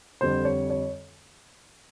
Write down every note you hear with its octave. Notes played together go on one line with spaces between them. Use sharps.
F2 D3 G3 C5
C#5
C#5